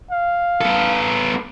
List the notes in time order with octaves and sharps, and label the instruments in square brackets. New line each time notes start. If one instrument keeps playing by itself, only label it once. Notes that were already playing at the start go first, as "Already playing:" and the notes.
[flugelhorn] F5
[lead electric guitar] B3 A4